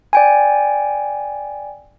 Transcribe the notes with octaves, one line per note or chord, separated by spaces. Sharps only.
D5 G5 G#5